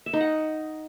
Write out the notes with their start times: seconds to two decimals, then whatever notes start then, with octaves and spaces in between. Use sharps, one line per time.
0.06 E5
0.13 D#4
0.21 F#5